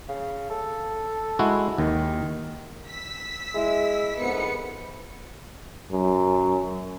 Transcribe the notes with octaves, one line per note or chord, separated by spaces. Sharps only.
C#3
A4
G#3 E4 F#4
D#2 D#3
E6 B6
G#3 E4
C2 F2 G#2 B3 C#7
F#2